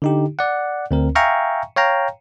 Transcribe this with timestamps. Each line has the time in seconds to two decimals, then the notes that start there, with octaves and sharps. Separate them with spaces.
0.02 D3 D#4 G4
0.39 D5 F#5
0.91 D2 C4 A#4
1.15 E5 F5 G5 G#5 A#5 C#6
1.76 C#5 F5 G5 A#5